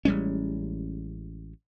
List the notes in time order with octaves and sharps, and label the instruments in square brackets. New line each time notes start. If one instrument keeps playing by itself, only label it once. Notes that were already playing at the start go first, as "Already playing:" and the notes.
[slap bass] A1 G3 G#3 C#4